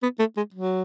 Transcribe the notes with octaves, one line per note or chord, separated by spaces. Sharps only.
B3
A3
G#3
F#3